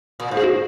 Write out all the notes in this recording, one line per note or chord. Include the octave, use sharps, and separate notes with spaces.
A#2
G#2
G#4
F#4